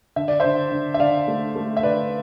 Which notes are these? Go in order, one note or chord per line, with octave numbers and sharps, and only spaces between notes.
D3 E5
D5
D3 C5 E5
D3
E5
D3 D5 F5
A3
A3
E5
D3 B4 D5